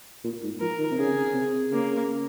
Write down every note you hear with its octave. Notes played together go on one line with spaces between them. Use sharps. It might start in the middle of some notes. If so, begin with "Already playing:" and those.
A#2
G#2
F3 A#4
D#3
C3
C#3 G#4
C3
C#3 A#3